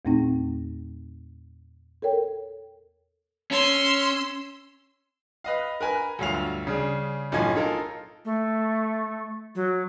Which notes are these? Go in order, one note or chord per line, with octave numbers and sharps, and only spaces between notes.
E2 A#2 A3 C4 D#4
A4 A#4 C#5 G5
C#4 C6 E6
B4 D#5 F5
A#4 B4 G#5
D2 G2 F#3 F4 F5 F7
C#3 G3 G#4
B1 F#2 A2 F3 G#5 G#6
D#4 F4 A4 A#4
A3
F#3